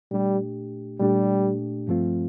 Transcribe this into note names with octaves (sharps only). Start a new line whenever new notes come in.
A#2 G3 A3 D4 G4
A#2 G3 A3 D4 G4
G2 F3 A3 C4 F4